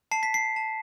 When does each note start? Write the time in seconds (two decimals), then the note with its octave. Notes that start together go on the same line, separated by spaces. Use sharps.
0.11 A5 C7
0.23 B6
0.34 C7
0.56 A5